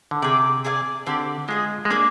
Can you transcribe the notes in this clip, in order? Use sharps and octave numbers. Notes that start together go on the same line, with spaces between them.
D3
C3 G#4 D5 G5
G#4 D5 F5 G#5
D3 C4 G4 D5
G#3 F4 G#4 D#5
G#3
A#3 D4 G#4 D5